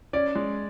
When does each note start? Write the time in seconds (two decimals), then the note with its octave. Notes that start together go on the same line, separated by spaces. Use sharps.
0.13 C#4 D5
0.35 G#3